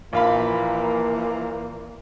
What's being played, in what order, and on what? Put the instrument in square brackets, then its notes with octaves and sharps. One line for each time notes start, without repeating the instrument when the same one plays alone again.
[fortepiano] A#1 F5 B5 [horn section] A#2 E3 A#3